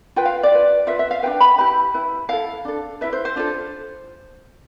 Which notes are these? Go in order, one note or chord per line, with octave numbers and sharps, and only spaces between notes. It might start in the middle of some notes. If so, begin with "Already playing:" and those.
F4 B4 G5
F5
D5
F4 B4
F4 B4 E5
E5
F5
D4 F4 B4 G5
B5
E4 G4 B4 B5
E4 B4
E4 A4 F5
D4 A4
E4 B4 E5
C5
C5
D4 F4 A4